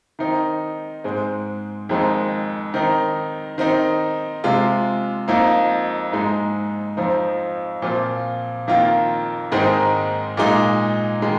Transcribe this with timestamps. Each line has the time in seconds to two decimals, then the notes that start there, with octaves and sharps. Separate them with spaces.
0.19 D#3 C4 D#4
1.04 G#2 G#3 C4
1.89 F2 D#3 G#3 C4 D#4
2.74 D#3 C4 D#4
3.58 D#3 C4 D#4
4.44 C3 G#3 F4
5.28 F2 F3 A#3 D#4
6.12 G#2 G#3 D#4
6.97 F2 F3 C4 D#4
7.82 A#2 F3 C4 F4
8.68 F2 D#3 A#3 F4
9.52 G#2 D#3 G#3 C4 D#4
10.37 A#2 G#3 D#4
11.22 D#3 G#3